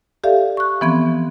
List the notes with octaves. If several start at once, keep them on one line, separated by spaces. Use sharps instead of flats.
G4 A4 D5 E5 F5
C#6 F#6
E3 F3 B3 C4 C6 G#6